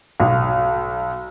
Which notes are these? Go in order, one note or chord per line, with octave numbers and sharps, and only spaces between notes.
B1